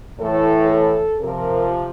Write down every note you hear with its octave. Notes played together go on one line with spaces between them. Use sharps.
A2 E3 A4
A4
C3 F3 A#4